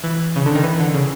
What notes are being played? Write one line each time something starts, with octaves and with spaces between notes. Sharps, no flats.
E3
C#3
D3
D#3
E3
D3
C#3